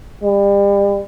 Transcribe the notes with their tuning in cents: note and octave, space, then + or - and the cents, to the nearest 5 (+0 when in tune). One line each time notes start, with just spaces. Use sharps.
G3 +35